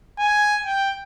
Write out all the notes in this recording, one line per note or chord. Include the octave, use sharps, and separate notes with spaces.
G#5
G5